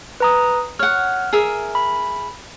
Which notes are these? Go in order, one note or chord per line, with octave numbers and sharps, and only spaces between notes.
B4 A#5 D#6
C#5 F#5 F6
G#4 A#4 E5
B5